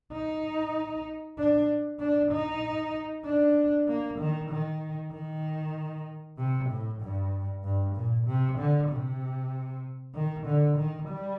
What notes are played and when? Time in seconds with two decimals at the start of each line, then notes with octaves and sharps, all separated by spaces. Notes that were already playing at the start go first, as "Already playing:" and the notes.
0.13 D#4
1.38 D4
2.00 D4
2.31 D#4
3.25 D4
3.88 A#3
4.19 D#3
4.51 D#3
5.13 D#3
6.39 C3
6.70 A2
7.02 G2
7.64 G2
7.95 A#2
8.27 C3
8.58 D3
8.89 C3
10.15 D#3
10.46 D3
10.77 D#3
11.08 G3